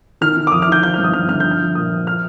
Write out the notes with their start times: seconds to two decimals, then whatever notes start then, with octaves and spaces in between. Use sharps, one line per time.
0.21 D#3 F6
0.36 D#3
0.47 D6
0.52 F2 D#6
0.62 F6
0.68 D#3 G6
0.83 F3 G6
0.94 F6
0.98 G2
1.04 D#6
1.13 G2 F6
1.29 D3 F6
1.40 F3 G6
1.51 F6
1.61 F3
1.75 A#2 D#6
1.92 F3
2.07 F6